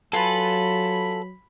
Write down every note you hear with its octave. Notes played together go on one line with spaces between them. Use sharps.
F#3 F4 A4 B4 G#5 B5